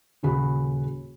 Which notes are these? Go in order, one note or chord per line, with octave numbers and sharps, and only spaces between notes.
D#1 C#3 F#4 B5